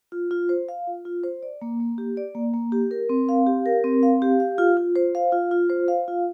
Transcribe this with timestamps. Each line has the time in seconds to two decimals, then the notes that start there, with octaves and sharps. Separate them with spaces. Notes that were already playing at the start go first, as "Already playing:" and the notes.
0.12 F4
0.31 F4
0.49 C5
0.69 F5
0.87 F4
1.05 F4
1.23 C5
1.43 D5
1.62 A#3
1.80 A#3
1.98 G4
2.17 D5
2.35 A#3
2.53 A#3
2.72 G4
2.91 A#4
3.09 C4
3.29 F5
3.47 G4
3.66 A#4
3.84 C4
4.03 F5
4.22 G4
4.40 F5
4.58 F4
4.77 F4
4.95 C5
5.15 F5
5.32 F4
5.51 F4
5.70 C5
5.88 F5
6.08 F4